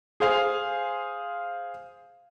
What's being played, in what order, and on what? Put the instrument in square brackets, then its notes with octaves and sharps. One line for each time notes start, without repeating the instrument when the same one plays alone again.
[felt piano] G#4 C5 F5 G#5